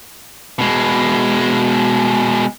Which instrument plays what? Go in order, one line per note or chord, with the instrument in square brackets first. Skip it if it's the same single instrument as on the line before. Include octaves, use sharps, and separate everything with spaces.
[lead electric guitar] B2 G#3